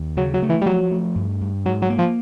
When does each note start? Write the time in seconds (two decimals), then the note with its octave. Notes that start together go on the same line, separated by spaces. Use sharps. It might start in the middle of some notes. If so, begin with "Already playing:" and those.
Already playing: D#2
0.17 C#3 F#3
0.34 F#3
0.42 A3
0.50 E3
0.61 G3
0.66 F3 F#3
0.91 A3
1.15 G2
1.41 G2
1.66 G#2 F#3
1.82 F#3
1.90 A#3
1.99 F3